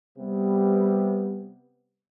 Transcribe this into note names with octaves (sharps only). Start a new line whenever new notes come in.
C3 G3 B3